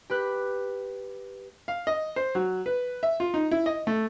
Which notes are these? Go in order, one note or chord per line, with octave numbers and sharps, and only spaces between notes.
G4 B4 F#6
F5
D#5
C5
F#3
B4
E5
F4
D#4
E4
D#5
A3